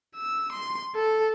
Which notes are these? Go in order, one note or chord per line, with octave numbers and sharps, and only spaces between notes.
E6
C6
A4